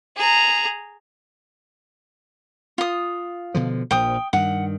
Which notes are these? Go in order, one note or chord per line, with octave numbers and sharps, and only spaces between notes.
G#4 A#5
F4 D#6
B2 D3 F3
A#1 F3 G5 D#6
G2 D#3 F#5